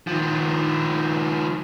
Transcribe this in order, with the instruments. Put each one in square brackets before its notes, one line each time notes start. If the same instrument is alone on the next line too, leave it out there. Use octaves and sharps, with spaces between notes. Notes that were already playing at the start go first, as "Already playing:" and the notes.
[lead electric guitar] D#3 F3